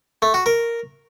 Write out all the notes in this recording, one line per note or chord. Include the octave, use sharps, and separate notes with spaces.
A3
F#4
A#4